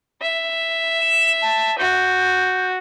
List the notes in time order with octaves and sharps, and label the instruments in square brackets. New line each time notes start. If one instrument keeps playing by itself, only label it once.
[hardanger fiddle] E5
[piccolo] E7
A5
[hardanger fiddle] F#4 [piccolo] G6